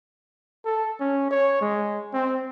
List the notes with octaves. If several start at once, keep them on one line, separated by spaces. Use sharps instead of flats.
A4
C#4
C#5
G#3
C4